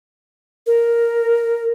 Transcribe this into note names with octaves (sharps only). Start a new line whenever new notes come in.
A#4